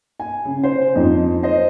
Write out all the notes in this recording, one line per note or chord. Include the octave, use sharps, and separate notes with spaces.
G#5
C#3
C5
F2 D#4
C5 D#5